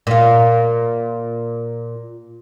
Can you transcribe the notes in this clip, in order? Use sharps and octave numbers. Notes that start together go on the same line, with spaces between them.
A#2 F4